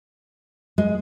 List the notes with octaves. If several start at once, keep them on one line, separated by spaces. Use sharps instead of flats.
G#3